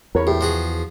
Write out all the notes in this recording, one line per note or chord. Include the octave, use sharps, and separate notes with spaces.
E2 A#4 C#5 B5
A2 G4
F3 F#4 G#4